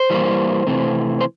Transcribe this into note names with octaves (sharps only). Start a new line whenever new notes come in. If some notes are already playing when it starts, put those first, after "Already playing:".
Already playing: C5
E3 G3 A#3
C3 E3 A3 C4
C5